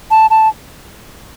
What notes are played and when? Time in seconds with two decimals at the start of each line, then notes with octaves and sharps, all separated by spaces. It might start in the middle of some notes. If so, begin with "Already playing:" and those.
0.11 A5
0.30 A5